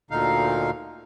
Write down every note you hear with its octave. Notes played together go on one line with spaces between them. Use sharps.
D2 A#2 D3 D#4 F5